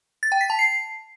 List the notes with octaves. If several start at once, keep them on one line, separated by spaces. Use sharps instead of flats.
A6
G5
B6
A5
C7